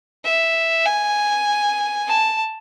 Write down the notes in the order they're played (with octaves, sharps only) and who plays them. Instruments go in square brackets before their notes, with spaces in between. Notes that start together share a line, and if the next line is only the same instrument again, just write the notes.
[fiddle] E5
G#5
A5